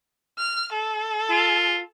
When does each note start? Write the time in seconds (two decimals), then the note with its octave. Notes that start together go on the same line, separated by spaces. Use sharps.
0.38 F6
0.73 A4
1.30 F4